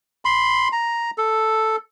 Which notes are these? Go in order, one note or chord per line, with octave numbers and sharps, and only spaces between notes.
B5 C6
A#5
A4